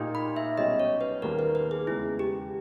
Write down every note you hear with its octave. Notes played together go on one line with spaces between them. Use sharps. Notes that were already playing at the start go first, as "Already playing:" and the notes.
Already playing: A#2 A#3 D#4 G4
B5
E5
B1 B2 G3 C#4 G4 D#5
C#5
B4
D#2 D#3 G3 A#3 A#4
B4
B4
G#4
E2 C#3 G#3 E4
G4